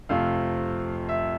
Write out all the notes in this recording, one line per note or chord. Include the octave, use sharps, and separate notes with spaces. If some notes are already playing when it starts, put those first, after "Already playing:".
F2 C3 F3 A3 F5
E5